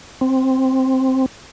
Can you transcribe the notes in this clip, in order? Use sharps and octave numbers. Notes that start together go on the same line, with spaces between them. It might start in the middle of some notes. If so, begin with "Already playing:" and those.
C4